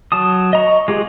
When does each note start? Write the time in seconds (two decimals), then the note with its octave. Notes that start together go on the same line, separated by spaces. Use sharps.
0.12 F#3 A5 D#6
0.53 D#5 A#5 C#6
0.88 G#3 F4 G4 G#4